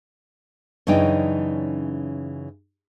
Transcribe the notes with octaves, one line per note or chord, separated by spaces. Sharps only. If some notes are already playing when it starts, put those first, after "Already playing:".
F#2 C#3 E3 D4 D#4 G5